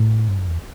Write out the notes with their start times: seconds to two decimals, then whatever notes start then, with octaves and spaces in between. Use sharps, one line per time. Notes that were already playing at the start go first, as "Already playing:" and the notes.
Already playing: A2
0.28 G2
0.38 F#2
0.48 E2